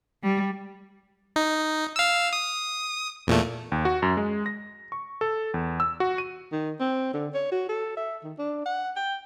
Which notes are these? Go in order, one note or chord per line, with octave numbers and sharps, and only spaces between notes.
G3
D#4
F5 E6
D#6
E2 A#2 A3
D#2
F#4
F#2
G#3
A#6
C#6
A4
E2
E6
F#4
D#7
D#3
C4
D3
C#5
F#4
A4
E5
D#3
D4
F#5
G5